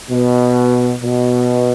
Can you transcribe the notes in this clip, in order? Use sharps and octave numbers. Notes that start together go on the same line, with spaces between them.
B2
B2